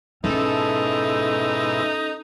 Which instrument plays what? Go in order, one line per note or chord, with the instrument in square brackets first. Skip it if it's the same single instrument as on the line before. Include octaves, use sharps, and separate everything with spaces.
[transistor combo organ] G#2 B2 E4 [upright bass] C#4 [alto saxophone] D#4 [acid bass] A4